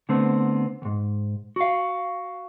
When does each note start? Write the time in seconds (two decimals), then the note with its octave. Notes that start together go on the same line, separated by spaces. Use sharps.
0.09 D3 A3 B3 C4
0.82 D2 G#2
1.56 F#4 F5